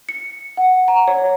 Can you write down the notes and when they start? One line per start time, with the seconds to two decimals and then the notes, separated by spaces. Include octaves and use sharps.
0.09 C#7
0.57 F#5
0.88 A#5
1.08 C#5